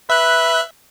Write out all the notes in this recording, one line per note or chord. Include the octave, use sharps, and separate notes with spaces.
B4 E5 F#6